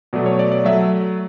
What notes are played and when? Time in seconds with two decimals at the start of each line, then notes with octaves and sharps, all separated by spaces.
0.13 B2 F#3 A3 D5
0.26 C#5
0.39 D5
0.52 D5
0.65 F#3 A3 E5